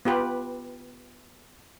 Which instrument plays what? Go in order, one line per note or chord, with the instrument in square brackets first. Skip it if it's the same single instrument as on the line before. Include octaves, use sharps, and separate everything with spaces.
[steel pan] B3 F4 G4 B4